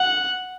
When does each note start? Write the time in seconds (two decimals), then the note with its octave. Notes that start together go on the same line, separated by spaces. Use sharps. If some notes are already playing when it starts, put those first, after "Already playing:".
Already playing: F#5